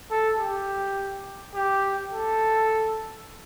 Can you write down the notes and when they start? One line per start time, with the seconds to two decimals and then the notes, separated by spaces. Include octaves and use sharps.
0.11 A4
0.40 G4
1.55 G4
2.13 A4